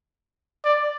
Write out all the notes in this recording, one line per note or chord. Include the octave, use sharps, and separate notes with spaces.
D5